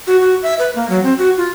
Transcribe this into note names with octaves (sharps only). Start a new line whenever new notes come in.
F#4
F#4
E5
B4
A#3
F#3
C4
F#4
F4